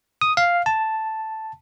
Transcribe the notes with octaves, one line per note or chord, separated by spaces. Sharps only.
D#6
F5
A5